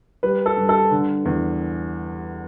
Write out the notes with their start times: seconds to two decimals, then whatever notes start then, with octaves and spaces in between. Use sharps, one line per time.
0.23 G3 B4
0.46 A4
0.57 G2
0.69 A4
0.91 D3
1.25 E2